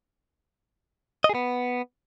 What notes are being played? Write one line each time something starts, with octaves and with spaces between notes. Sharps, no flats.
D#5
G#4
B3